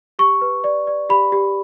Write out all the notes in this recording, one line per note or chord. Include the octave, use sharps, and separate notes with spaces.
G4 C#6
B4
D5
D5
G4 B5
G4